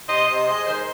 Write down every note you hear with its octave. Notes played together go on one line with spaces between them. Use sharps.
C3 C5 D#5
C3 C5 D#5
G#3 C5 D#5
D#3 G#4 C5